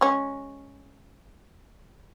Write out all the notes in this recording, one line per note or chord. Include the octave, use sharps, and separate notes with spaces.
G#3 C#4